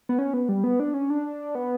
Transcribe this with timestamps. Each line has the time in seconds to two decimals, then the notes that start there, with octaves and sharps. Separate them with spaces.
0.09 B3
0.19 C#4
0.33 B3
0.49 G3
0.64 B3
0.80 D4
0.94 C#4
1.10 D4
1.55 B3